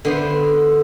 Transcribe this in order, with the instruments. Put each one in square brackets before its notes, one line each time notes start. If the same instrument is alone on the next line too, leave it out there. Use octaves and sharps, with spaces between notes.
[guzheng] D3 B3 C5